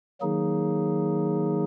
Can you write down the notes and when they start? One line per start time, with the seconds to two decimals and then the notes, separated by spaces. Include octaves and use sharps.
0.21 D#3 F#3 A#3 D#4 G#4